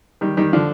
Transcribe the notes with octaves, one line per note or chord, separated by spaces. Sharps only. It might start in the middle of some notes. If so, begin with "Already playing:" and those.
D#3 G3
D#3 G3
D3 F3